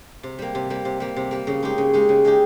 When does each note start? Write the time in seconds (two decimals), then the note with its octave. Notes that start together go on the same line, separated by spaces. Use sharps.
0.23 C3
0.39 G3 A#3
0.55 C3
0.70 G3 A#3
0.85 C3
1.00 G3 A#3
1.16 C3
1.31 G3 A#3
1.47 C#3
1.63 G#3 D#4 G4
1.78 C#3
1.93 G#3 D#4 G4
2.09 C#3
2.25 G#3 D#4 G4